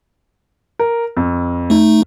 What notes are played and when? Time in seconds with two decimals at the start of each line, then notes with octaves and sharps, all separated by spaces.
0.79 A#4
1.17 F2
1.70 A3 D#4